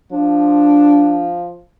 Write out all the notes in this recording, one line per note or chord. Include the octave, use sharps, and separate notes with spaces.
F3 D4